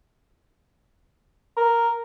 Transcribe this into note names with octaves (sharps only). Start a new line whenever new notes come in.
A#4